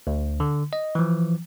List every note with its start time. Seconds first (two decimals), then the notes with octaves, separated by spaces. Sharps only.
0.07 D2
0.40 D3
0.73 D#5
0.95 E3 F3